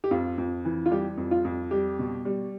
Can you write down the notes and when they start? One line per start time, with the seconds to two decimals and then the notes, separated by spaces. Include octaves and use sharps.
0.04 G4
0.11 F2 F4
0.38 F2
0.65 E3
0.86 F4
0.91 G3 G4
1.17 F2
1.31 F4
1.45 F2
1.71 G3 G4
1.99 B2
2.25 G3